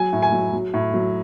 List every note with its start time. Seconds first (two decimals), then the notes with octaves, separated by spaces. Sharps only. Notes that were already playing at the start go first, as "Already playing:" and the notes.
Already playing: F#3 G#5
0.13 A2
0.22 G#5
0.32 F#3
0.53 F#3
0.74 A2
0.94 F#3